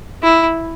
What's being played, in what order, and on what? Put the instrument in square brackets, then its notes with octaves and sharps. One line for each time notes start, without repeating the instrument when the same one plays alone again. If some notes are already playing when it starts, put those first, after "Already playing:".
[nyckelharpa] E4